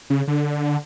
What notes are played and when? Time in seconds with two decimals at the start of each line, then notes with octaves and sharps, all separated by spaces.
0.10 C#3
0.28 D3